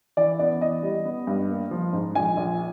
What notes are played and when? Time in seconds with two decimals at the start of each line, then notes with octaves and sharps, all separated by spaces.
0.17 E3 D5
0.39 B3 D5
0.61 E3 D#5
0.83 G3
1.05 B3
1.27 G2
1.49 A#3
1.71 F3
1.93 G#2
2.15 A#1 G#5
2.37 A#1